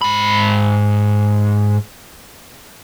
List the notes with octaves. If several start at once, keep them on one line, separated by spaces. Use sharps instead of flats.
G#2 B5